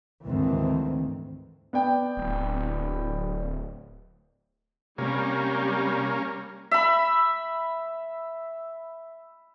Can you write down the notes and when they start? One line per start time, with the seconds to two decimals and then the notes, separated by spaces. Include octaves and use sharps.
0.24 D2 G#2 D#3 E3 A#3 C4
1.73 B3 D5 G5
2.17 D1
4.98 C3 G3 A#3 C#4
6.71 E5 B5